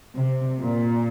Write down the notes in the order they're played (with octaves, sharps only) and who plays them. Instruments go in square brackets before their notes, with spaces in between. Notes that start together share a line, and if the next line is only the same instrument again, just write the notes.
[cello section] C3
A#2